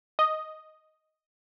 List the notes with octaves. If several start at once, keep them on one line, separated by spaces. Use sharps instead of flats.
D#5